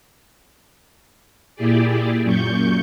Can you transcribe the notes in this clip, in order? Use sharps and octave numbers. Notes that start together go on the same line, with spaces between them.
A#2 E4 G4 G#4 D5
F#2 A#2 C#6 G6